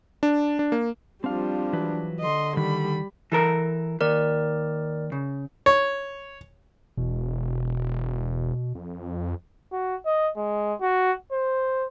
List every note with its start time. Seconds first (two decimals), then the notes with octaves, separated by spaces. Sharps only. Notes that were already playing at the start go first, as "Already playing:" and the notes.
0.23 D4
0.59 D4
0.72 A#3
1.24 F3 G3 C4 D4 F5
1.73 E3 F#3 B4
2.20 D3 D#5 C6
2.57 D#3 G3 B5
3.32 E3 A4 A#4
4.01 D#2 A#4 D5
5.12 C#3
5.66 C#5
6.97 E1 B2
8.75 F2
9.72 F#4
10.06 D#5
10.37 G#3
10.81 F#4
11.32 C5